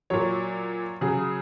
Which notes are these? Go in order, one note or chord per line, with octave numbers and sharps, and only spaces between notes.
A#2 F#3 C#5
C#3 F#3 G#4